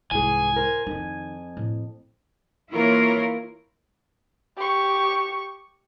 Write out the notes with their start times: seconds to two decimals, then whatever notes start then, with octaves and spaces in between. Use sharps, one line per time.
0.11 C2 G#2 E3 G#4 G#5
0.56 A#4 C5
0.87 F2 D#3 D#4
1.57 A2
2.73 E3 A#3 E4 F4 A#4 C#5
4.57 G4 C#6